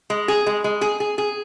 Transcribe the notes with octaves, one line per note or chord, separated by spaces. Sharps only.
G#3
G#4
G#3
G#3
G#4
G#4
G#4